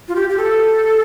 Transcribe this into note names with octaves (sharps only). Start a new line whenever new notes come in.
F4
G4
G4
A4